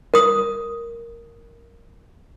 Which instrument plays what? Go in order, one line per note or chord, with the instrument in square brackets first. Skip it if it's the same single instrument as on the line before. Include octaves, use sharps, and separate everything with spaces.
[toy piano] A#4 D#6